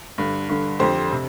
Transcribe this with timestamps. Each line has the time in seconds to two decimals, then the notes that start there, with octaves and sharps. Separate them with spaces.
0.18 G2 D3
0.49 G2 D3
0.79 F2 D3 G4 C5
1.13 C3